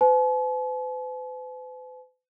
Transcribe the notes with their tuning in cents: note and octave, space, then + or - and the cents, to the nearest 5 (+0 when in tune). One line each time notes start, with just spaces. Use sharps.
B4 +45 A5 -45